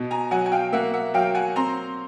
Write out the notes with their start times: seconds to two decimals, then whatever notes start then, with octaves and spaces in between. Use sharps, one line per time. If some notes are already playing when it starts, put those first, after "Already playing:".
Already playing: B2
0.11 G#5 A#5
0.31 F#3 F#5 G#5
0.46 G#5
0.52 F5 G5
0.72 A#3 E5 F#5
0.93 E5 F#5
1.14 F#3 F5 G5
1.35 F#5 G#5
1.56 C4 A#5 C6